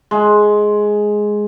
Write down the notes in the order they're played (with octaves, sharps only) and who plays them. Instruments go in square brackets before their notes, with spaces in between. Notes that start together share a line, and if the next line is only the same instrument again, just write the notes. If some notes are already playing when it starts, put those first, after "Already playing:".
[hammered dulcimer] G#3